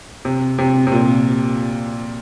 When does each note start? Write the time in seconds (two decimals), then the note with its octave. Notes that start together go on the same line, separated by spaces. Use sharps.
0.25 C3
0.58 C3
0.87 C3
0.92 A#2